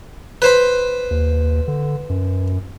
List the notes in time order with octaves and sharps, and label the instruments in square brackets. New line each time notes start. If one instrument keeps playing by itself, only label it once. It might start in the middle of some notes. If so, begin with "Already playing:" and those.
[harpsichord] B4 C5 B5
[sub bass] D#2
D3
F#2